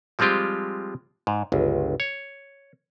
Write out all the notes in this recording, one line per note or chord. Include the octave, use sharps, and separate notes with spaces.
F3 G3 G#3 C4 F4 G4
G#2
G1 C#2
C#5